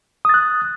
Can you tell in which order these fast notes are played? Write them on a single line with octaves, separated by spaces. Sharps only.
D#6 A6 F#6